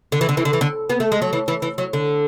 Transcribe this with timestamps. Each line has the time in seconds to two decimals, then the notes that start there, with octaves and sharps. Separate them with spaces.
0.12 D3
0.21 E3
0.29 D3
0.37 E3
0.45 D3
0.53 E3
0.61 D3
0.90 B3
1.00 A3
1.12 G#3
1.22 F#3
1.33 E3
1.48 E3
1.62 E3
1.78 F#3
1.93 D3